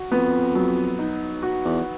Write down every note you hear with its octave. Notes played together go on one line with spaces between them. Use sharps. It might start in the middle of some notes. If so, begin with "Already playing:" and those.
Already playing: F#4
F2 B3
F#3
D#4
F#4
E2